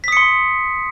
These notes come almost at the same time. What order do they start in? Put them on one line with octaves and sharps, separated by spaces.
B6 D#6 C#7 C6